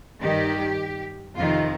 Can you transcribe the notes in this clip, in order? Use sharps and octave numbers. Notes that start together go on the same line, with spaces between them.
G2 D#3 G4
F2 C3 D#3 F4